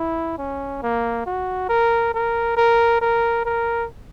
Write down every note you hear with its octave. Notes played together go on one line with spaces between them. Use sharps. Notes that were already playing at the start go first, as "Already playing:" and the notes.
Already playing: E4
C#4
A#3
F#4
A#4
A#4
A#4
A#4
A#4